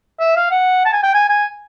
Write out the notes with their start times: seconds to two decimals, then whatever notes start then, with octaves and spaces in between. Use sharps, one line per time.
0.20 E5
0.36 F5
0.51 F#5
0.86 A5
0.93 G#5
1.03 G5
1.14 G#5
1.29 G#5